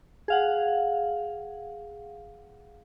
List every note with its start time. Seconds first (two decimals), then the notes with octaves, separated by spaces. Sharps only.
0.28 G#4 F5 F#5